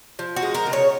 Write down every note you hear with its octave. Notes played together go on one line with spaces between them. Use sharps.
F3
F#4
G#3
A#4
C#3
C#5